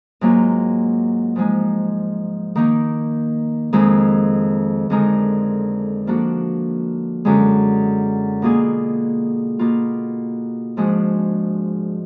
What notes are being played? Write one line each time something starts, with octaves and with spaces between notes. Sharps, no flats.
G#2 F#3 A#3 F4
G#2 F3 G#3 D#4
D#3 A#3 D#4
F2 D#3 G#3
F2 D3 G#3 D#4 A#4
F3 A#3 D4 F#4
F#2 D3 G#3
B2 A#3 F4 G#4
B2 A#3 F4
G#2 F3 G#3 D4 F#4